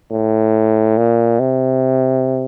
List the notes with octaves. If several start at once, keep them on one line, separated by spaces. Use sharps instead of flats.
A2
A#2
C3